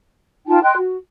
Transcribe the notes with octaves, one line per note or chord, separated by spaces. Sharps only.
D#4 F4 G5 A5
D#5 G5 C6 F#6
F#4